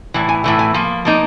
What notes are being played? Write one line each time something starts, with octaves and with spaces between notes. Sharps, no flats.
A2 E3
G#5
A2 E3 A3
G#5
F3 A#3
F3 A#3 D#4